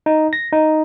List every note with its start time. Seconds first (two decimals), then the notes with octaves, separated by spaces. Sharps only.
0.06 D#4
0.33 A#6
0.52 D#4